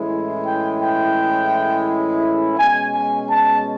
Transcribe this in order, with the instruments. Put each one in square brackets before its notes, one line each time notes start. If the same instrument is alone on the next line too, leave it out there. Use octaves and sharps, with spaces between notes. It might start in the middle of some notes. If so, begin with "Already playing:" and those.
Already playing: [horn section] A2 E3 G#3 C#4 E4
G5
G5
B2 G#3 C#4 G#5
G#5
A5